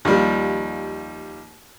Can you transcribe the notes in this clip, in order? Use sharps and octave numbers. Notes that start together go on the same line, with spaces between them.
D#2 F3 G3